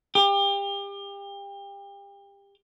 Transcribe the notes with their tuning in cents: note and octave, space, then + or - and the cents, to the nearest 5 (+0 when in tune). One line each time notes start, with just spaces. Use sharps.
G4 +30